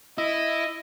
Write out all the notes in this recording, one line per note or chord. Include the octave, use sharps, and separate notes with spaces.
E4 D#5